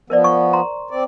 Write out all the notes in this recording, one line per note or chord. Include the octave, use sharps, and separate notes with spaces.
F3 B3 A#4 C5 D5
C#6
A#5 C6
C4 D5